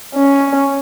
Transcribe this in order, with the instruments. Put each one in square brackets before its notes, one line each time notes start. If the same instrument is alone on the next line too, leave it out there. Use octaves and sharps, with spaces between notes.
[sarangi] C#4